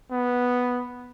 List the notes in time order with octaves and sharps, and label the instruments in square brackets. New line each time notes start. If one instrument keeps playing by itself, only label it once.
[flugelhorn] B3